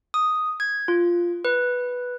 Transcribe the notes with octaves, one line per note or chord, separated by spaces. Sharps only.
D#6
G#6
F4
B4